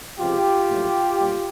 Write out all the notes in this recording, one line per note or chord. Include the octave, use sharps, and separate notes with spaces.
C#2 C3 F3 G#3 F4 G4
A#1 A2 F#3 A3
B1 A#2 G3